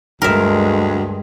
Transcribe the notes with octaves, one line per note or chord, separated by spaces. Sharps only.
D2 G2 G#3 A#4 E5